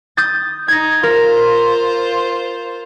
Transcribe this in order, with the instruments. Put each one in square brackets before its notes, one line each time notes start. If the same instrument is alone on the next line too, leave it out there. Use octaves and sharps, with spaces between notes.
[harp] D#6 G6 A6
[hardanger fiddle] D#4 [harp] G#6 A#6
[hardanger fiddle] F4 C5 [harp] A#4